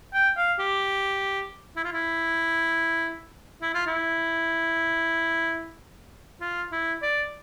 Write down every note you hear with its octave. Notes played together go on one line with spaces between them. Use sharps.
G5
F5
G4
E4
F4
E4
E4
F4
E4
F4
E4
D5